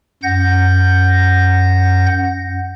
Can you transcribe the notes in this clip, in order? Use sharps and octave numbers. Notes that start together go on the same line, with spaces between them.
F#2 F#5 G6 A#6